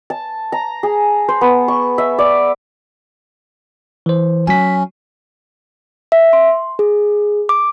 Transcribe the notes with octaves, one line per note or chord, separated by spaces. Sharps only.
A5
A#5
G#4
C5
B3
C#6
E5
D5
E3 C5
F#3 C#4 G#5 B6
E5
C6
G#4
D6